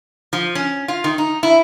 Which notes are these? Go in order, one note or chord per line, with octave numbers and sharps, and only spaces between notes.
F3
C#4
F4
D#3
D#4
E4